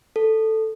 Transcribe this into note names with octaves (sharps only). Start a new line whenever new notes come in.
A4